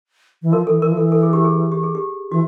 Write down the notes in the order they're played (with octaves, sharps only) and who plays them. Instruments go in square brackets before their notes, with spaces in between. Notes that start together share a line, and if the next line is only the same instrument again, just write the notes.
[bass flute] E3
[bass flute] F3 [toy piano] A#4
[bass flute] E3 [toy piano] A4
[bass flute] E3 [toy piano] A#4
[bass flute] F3
[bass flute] E3 [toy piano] A4
[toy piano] A4
G#4
G4
G#4
G4
G#4
G4
[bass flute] E3 [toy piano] F#4